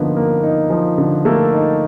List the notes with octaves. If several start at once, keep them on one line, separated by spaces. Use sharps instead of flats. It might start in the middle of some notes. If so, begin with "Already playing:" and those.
Already playing: D3 F3 A#3 B3 D#4 A#4 B4
A#3
D#4
F3
D3
A3 A#3 A4
D#4